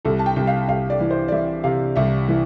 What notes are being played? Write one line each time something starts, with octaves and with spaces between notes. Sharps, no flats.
C2 A4
A5
G5
C2
F5
C2 F5
D5
E3
C5
D5
E3 E5
C3 F5
C2 E5
E3